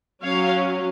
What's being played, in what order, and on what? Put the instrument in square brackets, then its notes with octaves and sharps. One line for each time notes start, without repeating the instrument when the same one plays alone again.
[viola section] F#3 C#4 C#5 F5